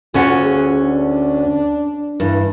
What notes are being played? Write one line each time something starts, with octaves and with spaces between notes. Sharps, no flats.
D2 C#4 F4 F#5
G#4
D4
G2 E3